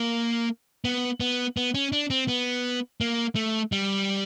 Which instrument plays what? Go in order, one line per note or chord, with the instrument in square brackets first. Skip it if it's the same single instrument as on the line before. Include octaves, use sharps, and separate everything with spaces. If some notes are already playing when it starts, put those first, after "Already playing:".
Already playing: [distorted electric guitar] A#3
B3
B3
B3
C#4
D4
C4
B3
A#3
A3
G3